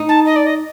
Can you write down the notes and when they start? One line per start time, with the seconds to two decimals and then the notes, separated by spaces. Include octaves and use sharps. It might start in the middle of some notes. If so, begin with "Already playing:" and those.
Already playing: D#4
0.08 A5
0.25 D#5
0.36 D5
0.46 D#5